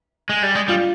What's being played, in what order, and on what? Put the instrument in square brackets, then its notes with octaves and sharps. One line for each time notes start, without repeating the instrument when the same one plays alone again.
[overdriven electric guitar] G#3
G3
G#3
[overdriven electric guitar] G3 [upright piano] F4